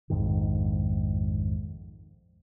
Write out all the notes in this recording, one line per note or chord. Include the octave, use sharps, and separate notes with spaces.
A#1 F2 G#2 D#3